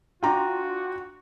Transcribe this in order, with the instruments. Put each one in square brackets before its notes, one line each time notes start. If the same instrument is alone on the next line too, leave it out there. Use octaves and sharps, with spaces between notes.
[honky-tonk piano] D4 F4 [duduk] F#4 [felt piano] G5 A#5 D6